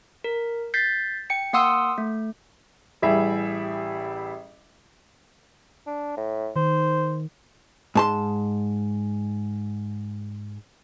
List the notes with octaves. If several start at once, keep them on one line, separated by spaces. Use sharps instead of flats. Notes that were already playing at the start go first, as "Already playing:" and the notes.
A#4
G6 A6 B6 C7
G5 C#7
A#3 F5 F#5 C6 D#6 E6
A3
A1 G3 E4 G#4 E5
D4
A2
D#3 C5
G#2 A5 C6